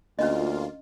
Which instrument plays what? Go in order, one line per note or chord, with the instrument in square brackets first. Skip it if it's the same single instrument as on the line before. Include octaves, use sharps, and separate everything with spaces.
[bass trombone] D2 [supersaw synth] A#3 F4 [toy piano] C#4 D4 D#5